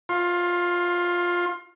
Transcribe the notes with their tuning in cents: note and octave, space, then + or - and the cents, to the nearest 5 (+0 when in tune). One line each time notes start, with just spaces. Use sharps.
F4 +10 C6 +30